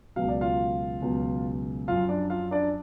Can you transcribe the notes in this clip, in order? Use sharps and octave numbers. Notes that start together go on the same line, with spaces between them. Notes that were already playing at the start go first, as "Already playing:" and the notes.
C#2 B2 F#3 F5
D5
F4 F5
C#2 B2 F#3
F#2 F3 F4 F5
D4 D5
F4 F5
D4 D5